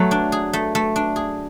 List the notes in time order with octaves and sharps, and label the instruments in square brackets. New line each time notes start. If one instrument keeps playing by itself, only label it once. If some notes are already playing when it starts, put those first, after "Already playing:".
Already playing: [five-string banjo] F#3 [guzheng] A3
[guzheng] D4
G#4
A3
A3
D4
G#4